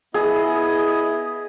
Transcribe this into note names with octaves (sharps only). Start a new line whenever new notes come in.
B3 E4 G#4 D#5